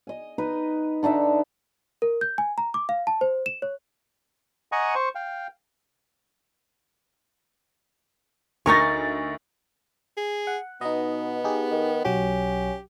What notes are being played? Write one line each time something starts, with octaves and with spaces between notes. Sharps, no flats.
D#5 G#5
D#4 B4 D#5
D3 D4 D#4 E5
A#4
G6
G#5
A#5
D6
F5
A5
C5
E7
C#5
D#5 F#5 G#5 A#5 C#6 D#6
C5 C#6
F5 G5
D2 D#4 A#4 C#5 C#6 A6 A#6
G#4
F#5
B2 B3 D#4 D#5
D#4 G4 G#4
D#3
B1 F#3 C#4 F#4 G4